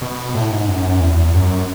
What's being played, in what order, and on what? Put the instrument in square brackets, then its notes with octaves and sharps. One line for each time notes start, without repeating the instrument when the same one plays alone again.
[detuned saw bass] B2
A2
G#2
F#2
E2
F#2